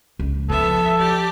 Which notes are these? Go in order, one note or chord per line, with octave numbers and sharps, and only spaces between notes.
C#2
F3 B3 A4 E5
G4 D5